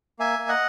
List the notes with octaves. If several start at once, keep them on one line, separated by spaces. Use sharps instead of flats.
A#3 E5 G#5
A#3
D#5 F#5